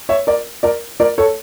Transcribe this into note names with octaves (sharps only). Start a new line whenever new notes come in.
C#5 E5
A#4 D5
A#4 D5
A#4 D5
A4 C#5